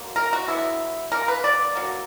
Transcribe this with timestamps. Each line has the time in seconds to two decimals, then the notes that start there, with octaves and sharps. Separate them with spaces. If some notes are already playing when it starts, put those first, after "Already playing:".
Already playing: D3 F#3 A#3
0.16 A#4
0.33 F#4
0.48 D3 F#3 B3 E4
1.12 D3 A#3 A#4
1.28 B4
1.44 D5
1.75 D3 F#3 A#3